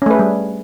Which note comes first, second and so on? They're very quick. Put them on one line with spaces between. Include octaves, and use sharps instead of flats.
C#4 A3 B4 G#4 G3